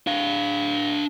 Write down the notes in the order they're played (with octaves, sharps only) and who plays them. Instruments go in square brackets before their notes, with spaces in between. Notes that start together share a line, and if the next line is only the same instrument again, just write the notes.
[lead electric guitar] D4 F5